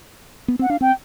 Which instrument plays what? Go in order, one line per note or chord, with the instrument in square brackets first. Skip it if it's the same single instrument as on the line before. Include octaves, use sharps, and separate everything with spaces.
[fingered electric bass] B3
[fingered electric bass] C4 [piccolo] F#5
[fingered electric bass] D4 [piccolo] F5
[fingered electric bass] C4 [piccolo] G5